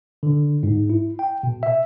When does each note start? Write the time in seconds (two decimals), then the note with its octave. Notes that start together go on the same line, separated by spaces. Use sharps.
0.23 D3
0.63 G#2
0.90 E4
1.19 G5
1.43 B2
1.63 E5